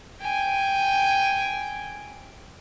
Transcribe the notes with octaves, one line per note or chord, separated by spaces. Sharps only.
G5 G#5